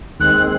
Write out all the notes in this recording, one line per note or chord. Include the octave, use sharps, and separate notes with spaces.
D#2 D#3 G#3 C4 F#6